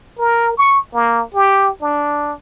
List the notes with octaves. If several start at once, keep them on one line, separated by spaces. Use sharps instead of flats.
A#4
C#6
A#3
G4
D4